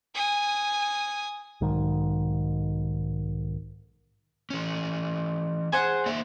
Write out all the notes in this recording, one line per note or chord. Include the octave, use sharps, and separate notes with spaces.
G#5 D#6
B1 G#2 D#3
E3 C#4
G#4 C5 F#5
A#3 D5 E5